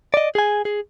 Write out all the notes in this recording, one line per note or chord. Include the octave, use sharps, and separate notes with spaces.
D5 D#5
G#4 G#5
G#4